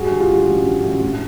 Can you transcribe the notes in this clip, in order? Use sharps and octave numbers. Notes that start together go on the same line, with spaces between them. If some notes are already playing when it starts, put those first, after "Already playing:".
Already playing: G2 F#4 G#4
D3
F4 G4
G2
A1
D3
A1
A2